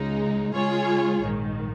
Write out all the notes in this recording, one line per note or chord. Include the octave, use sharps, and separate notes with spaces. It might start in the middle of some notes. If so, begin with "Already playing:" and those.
Already playing: C#2 C#3 G#3 D#4
C#3 G#3 F4 G#4 C#5
A#1 G#2 D#3